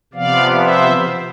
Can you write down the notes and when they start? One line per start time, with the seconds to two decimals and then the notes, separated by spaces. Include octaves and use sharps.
0.13 C3 F3 B3 D5 F5
0.60 C5 E5